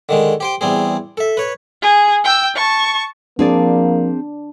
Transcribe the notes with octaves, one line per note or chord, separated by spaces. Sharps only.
D3 D#3 G#3
G4 C5 G5
E2 G3 C4 G#4
A4 E5
B4 C#5
G#4
G5 E6
A5 C#6
F3 A#3 C4 D4 G#4 D5